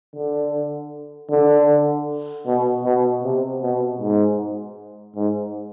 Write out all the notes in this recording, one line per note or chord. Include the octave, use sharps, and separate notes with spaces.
D3
D3
B2
B2
C3
B2
G#2
G#2